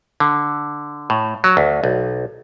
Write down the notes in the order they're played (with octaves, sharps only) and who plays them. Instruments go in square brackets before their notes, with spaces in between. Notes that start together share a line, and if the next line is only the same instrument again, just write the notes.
[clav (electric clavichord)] D3
A2
F#3
D2
B1